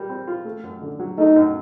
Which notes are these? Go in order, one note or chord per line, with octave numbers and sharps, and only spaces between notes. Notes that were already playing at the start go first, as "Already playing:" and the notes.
Already playing: G3 A#4
C4
F4
A3
F#2
D3
F#3
A3 D#4
F#2